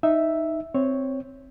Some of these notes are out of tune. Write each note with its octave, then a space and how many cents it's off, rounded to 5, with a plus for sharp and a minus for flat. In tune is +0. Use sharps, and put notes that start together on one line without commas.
D#4 +0 E5 +0
C4 +0 C#5 +0